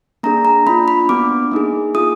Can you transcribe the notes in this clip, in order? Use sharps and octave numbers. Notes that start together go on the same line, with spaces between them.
A#3 D4 G#4 A#5
A#5
A#3 D4 F4 B5
B5
B3 D4 F#4 D6
A#3 D#4 G#4
A#3 F4 G#4 D#6